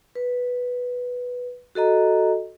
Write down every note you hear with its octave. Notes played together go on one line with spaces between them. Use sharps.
B4
F#4 A4 D#5 A#5